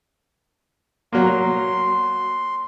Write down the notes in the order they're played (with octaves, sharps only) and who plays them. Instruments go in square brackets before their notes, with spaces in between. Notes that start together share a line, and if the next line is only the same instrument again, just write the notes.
[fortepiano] F#3 A#3 [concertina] C6